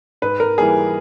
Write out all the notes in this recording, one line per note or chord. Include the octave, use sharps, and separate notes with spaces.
G#2 B4
A#4
E3 G3 A#3 G#4